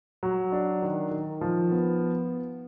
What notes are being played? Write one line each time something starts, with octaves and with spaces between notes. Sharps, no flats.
F#3
D4
D#3
D#3
F3
B3